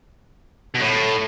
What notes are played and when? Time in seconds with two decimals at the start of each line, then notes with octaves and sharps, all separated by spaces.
0.74 B2
0.80 A2